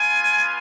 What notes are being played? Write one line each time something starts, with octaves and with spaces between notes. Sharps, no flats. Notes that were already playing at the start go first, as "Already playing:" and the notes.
Already playing: B3 F4 G#5